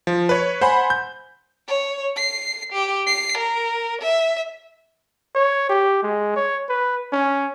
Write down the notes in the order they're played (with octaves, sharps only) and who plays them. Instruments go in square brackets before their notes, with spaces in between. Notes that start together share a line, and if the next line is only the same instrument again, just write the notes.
[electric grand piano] F3
B4 C#5
C5 F#5 G#5 B5
G6
[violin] C#5
C7
G4
C7
A#4
E5
[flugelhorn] C#5
G4
G#3
C#5
B4
C#4